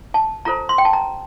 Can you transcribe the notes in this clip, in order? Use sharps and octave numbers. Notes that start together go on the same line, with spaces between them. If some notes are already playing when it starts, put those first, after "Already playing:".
A5
F4 A4 C5 A#5
C6
G5
A5
A#5